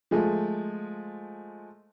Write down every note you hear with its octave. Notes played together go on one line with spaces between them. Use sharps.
F3 G#3 A3